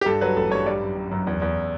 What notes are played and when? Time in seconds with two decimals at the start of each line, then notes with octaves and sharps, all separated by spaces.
0.01 G4
0.06 G2 A4
0.21 F#3 B4
0.36 A1 A4
0.51 G2 C#5
0.66 G3 D5
0.82 F#2
0.97 F#2
1.11 F#2
1.27 E2
1.42 E2